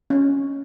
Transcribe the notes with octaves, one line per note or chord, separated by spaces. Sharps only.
C#4